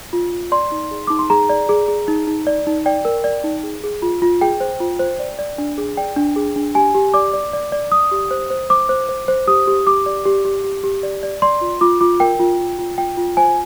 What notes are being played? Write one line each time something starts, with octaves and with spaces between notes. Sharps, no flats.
F4
F4
D5 C6
D#4
G#4
D#4 D6
C6
G#4 A#5
D5
G#4
G#4
D#4
D#4
D5
D#4
D5 G5
A#4
D5
D#4
G#4
G#4
F4
F4
G#4 G5
C5
F4
C5
D5
D5
D4
G#4
D5 G5
D4
G#4
D4
G4 G#5
G4
D5 D6
D5
D5
D5
D5 D#6
G4
C5
C5
C5 D6
C5
C5
C5
G4 D#6
G4
G4 D6
D5
G4
G4
G4
G4
D5
D5
D5 C6
F4
F4 D6
F4 D6
A#4 G5
F4
F4
F4
F4 G5
F4
C5 G#5